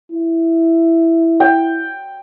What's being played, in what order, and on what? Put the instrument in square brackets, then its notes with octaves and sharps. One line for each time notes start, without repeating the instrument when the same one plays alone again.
[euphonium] E4
[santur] G5